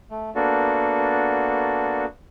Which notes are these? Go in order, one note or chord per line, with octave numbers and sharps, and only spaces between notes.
A3
A#3 B3 D4 F#4 A4